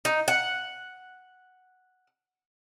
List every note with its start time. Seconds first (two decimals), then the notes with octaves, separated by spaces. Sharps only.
0.05 D#4
0.28 F#5